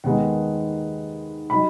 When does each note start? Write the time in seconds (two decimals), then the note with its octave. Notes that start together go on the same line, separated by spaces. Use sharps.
0.04 D#2 D#3 G#3 B3 D#4 F#5
1.50 F#3 D#4 B5